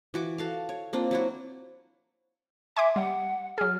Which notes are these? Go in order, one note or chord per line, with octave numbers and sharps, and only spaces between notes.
E3 F#4 D6
F#4 A4 F5
C#5
A#3 C4 D4 F4
F#3 E4 F#4
E5 G#5 C6 D6
G3 F#5
F#3 G#4 F6